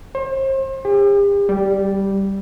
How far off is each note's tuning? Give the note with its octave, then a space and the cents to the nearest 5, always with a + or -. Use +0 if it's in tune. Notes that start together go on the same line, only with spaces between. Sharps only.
C5 +40
G4 +40
G3 -5